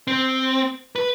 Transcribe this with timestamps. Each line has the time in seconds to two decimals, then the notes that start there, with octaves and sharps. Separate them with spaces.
0.07 C4
0.96 B4